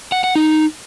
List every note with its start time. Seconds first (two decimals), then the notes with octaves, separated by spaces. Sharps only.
0.12 F#5
0.24 F#5
0.35 D#4